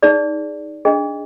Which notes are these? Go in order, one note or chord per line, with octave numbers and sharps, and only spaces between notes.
D#4 G#4 D5
D4 G#4 D#5